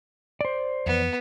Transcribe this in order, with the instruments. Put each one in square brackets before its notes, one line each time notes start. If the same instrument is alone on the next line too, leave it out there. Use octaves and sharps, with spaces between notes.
[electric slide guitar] C5 D5
[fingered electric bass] F2 E3 [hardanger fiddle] B3